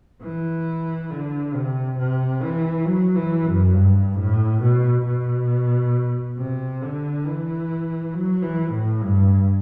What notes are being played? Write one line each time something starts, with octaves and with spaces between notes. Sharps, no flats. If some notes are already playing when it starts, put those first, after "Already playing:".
E3
D3
C3
C3
E3
F#3
E3
F#2
G2
A2
B2
B2
C3
D3
E3
F#3
E3
A2
G2